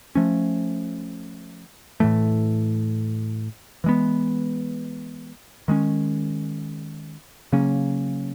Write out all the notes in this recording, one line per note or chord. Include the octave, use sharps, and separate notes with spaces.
F3 A3 C#4
A2 E3 A3
E3 G#3 B3
D#3 G#3 C#4
C#3 F#3 A#3 C#4